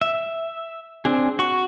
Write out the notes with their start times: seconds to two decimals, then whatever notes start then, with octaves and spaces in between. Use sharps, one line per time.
0.01 E5
1.05 C4 D4 G#4
1.39 F#4 C#6